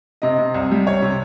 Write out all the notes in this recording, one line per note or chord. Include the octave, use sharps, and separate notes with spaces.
C3 D#5
C3
C2
G3
C2 C#5
C3